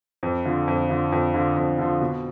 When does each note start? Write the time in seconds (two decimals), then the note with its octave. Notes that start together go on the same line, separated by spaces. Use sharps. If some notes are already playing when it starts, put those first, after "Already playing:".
0.23 F2
0.45 D3 F3
0.67 F2
0.90 D3 F3
1.12 F2
1.34 D3 F3
1.57 F2
1.78 D3 F3
2.01 B2